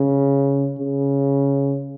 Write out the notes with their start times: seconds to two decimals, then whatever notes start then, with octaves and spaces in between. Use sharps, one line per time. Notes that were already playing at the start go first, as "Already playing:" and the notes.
Already playing: C#3
0.79 C#3